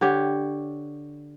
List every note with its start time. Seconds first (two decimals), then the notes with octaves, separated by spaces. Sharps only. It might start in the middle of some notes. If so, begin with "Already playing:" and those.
0.01 D3 G4 C#5